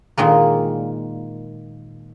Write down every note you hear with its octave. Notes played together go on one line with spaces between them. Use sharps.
A#2 D#3 G#3 A#3